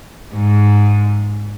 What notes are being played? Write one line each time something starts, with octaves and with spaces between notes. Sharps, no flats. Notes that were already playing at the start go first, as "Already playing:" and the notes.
G#2